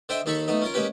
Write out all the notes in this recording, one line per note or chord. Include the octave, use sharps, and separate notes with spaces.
D3 C5 D#5 E5 G5
D#2 D#4 A4 B5 C#6
A3 B3 D#4
C#4 F4 A#4
G#3 A#3 C#4 G4 B4